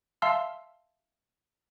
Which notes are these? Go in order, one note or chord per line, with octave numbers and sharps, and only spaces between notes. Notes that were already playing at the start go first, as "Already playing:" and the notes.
E5 F5 A5 C6 E6 F6